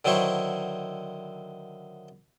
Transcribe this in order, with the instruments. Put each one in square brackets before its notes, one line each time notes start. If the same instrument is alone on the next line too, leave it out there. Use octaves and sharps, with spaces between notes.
[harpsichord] D3 D#3 F#3 E4 C5 C#6